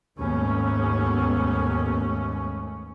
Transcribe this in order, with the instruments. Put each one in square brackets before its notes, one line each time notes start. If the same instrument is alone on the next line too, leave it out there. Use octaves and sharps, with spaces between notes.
[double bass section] D#2 G#2 A3 B3 C#4